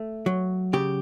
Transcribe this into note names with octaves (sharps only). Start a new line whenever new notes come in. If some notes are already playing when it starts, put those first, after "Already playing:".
Already playing: A3
F#3
C#3 G4